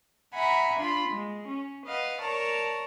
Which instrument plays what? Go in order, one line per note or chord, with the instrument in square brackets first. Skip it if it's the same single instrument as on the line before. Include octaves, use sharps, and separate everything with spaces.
[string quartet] E5 F#5 G#5 A#5 B5
D4 F4 B5 C6
G#3
C#4
B4 D#5 F5 F#5
A#4 C#5 D5 A5 A#5